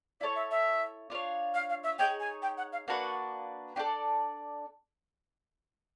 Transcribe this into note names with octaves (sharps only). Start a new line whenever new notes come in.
E4 A4 C#5 D5
E5
E5
D4 F4 A#4 C#5
F5
F5
E5
D#4 G#4 C#5 G5
G#5
G5
F#5
F5
A#3 D4 F#4 B4 F#5
D4 F#4 A4 D5 G5